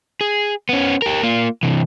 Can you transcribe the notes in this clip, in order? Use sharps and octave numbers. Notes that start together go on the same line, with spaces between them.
G#4
B3 C#4
G4 A#4
A#3 F4
C3 E3